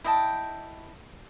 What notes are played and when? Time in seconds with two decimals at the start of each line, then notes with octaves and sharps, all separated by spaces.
0.04 E4 D#5 G5 A5